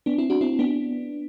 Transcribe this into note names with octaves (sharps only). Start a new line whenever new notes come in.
B3 D4
C4 E4
D4 F#4
C4 E4
B3 D4